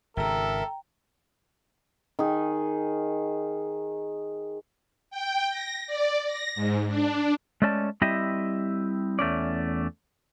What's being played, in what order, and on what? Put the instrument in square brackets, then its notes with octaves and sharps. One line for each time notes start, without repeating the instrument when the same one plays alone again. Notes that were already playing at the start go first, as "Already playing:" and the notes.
[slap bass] G#1 C#3 [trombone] A4 [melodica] A#4 E5 [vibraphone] G5 A#5
[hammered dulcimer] D#3 G#4
[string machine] G5
A#6
D5
A#6
G#2
D4
[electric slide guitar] G#3 A3 C#4 D5 A5
G3 C4 E4 G4 D#5 E5
E2 A3 C#4 D5